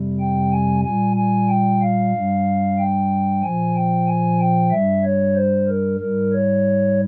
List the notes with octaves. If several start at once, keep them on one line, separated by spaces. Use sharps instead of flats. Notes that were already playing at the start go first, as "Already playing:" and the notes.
Already playing: F2 C3 G3
G5
G#5
A#2 G3 G#5
G#5
G5
F5
G2 G3
G5
A#2 F3 G#5
G5
G#5
G5
G2 G3 E5
C#5
C5
A#4
G#2 G3 A#4
C#5